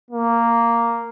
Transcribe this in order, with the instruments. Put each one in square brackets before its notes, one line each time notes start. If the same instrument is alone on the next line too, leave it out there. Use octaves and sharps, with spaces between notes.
[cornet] A#3